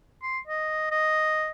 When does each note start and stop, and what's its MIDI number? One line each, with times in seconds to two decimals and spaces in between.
0.23 0.39 84
0.47 0.87 75
0.91 1.51 75